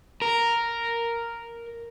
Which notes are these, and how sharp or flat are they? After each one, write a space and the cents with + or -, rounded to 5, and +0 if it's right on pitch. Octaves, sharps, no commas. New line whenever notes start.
A#4 +0